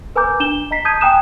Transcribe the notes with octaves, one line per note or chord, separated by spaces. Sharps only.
A#4 B4 G#5 A#5 D6 G6
D4 E7 G7
D#5 A#5 B6 C7
A5 D#6 G6 G#6 D#7
G5 G#5 A#5 D#6 F#6 E7